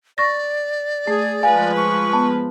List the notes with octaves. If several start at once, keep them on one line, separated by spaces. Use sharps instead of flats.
D5 C#6 A6 A#6
A3 G#4
F3 G#3 B4 F5 G#5
C#6
B3 A5